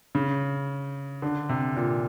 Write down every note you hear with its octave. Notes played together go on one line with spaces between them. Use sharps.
C#3
D3
C3
A#2